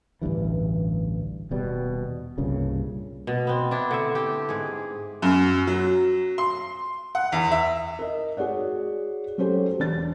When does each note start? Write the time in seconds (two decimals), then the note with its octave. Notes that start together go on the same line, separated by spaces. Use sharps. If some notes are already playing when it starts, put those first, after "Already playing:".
0.22 A1 D2 G2 E3
1.51 D#1 B2 G3
2.38 C2 G2 A#2 C#3
3.27 B2
3.47 B3 C4
3.71 D4 E4
3.91 D3 E5
4.15 G4
4.49 G#2 G#4
5.22 F#2
5.67 F#3
6.38 C6
7.15 F#5
7.32 E2
7.51 E5
7.99 A#4 D#5
8.37 F#4 G#4 C#5 D5 F#5
9.38 F#3 C#4 G4 A4 C5 C#5
9.79 E1 D4 A6